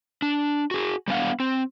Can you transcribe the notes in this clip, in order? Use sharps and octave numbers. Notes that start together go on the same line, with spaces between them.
D4
F#4 G#4
G3 B3 D4 F5 F#5
C4